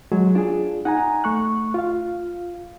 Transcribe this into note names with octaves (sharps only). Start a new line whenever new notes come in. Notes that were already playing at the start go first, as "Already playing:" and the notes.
F#3 G#3 F#4
D4 F4 G#4
D#4 F#5 G#5 A#5
A3 C#6 F#6
F4 F5